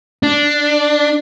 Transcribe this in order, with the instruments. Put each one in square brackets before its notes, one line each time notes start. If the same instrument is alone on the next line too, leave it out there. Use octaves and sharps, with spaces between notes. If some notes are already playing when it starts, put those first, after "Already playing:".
[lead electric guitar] D4